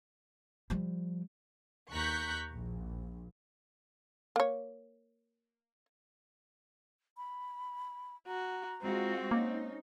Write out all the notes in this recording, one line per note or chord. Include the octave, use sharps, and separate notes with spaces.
F3 G3
D#2 A#5 C#6 F#6 G6 B6
A#1
A#3 C#5
B5
F#4 A#5
G#3 C4 F4 F#4
A#3 C#4 D#4